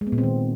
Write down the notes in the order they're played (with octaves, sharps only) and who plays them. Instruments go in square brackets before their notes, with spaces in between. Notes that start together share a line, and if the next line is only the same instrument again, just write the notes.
[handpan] G#3
B3
A#2
C4
D#3